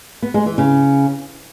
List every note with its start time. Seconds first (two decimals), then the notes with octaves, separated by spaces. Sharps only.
0.22 B3
0.34 G#3
0.46 E3
0.58 C#3